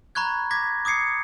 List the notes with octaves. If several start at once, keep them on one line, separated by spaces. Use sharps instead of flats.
A#5 B5 C#6 F#6 G#6
D6 G#6 A#6 B6
D6 D#6 G#6 C7 C#7